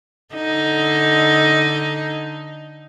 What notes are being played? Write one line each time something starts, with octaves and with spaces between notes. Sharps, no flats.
D3 D#4